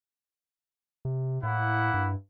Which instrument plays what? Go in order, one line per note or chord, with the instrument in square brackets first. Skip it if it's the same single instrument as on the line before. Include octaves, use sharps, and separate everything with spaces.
[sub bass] C3
[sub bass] A2 [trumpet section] A#3 E4 F#5
[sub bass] G2